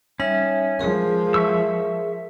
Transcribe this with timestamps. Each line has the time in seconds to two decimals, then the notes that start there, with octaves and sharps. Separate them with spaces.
0.20 G3 C#4 D#4 E5
0.79 F3 G#3 G#4 A#4
1.34 E5 C#6 E6